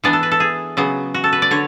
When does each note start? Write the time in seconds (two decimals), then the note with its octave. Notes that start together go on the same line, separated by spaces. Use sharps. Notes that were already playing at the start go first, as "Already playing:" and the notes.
0.04 E3 B3 D4 D5
0.13 A4
0.23 B4
0.31 A4
0.40 G#4
0.77 C#3 F#3 B3
1.14 F#4
1.24 A4
1.33 B4
1.42 D5
1.51 D3 C#5